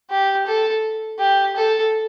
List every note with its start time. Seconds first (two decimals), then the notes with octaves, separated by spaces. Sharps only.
0.10 G4
0.47 A4
1.19 G4
1.56 A4